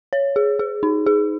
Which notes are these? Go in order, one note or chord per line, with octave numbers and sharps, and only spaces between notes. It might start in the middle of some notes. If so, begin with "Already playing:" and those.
C#5
G#4
G#4
D#4
G#4